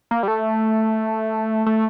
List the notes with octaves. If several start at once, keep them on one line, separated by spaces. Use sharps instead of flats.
A#3
G3
A3
A3